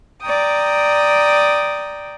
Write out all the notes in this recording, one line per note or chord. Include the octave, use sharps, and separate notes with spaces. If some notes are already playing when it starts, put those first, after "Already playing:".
D5 G5 A#5 D#6